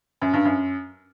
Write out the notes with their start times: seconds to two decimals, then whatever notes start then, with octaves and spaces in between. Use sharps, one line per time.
0.22 F#2
0.33 G2
0.45 F#2